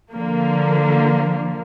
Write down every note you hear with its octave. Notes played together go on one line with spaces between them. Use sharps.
D3 F3 A#3